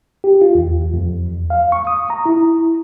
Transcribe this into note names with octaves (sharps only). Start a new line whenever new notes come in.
G4
F4
E2
F2
E2
F5
C#6
D#6
A#5
E4